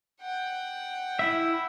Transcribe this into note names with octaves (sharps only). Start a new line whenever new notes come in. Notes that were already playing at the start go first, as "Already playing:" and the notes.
F#5 G5
E4 E5